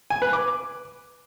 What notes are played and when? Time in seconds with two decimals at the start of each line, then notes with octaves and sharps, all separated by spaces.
0.10 G#5
0.22 B4
0.33 D6